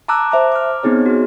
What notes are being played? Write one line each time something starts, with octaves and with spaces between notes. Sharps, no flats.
A5 A#5 D6 E6 F#6
C5 E5 A#5 D6
D6 F6
B3 C4 D#4 G#4 C#5
F#4 G#4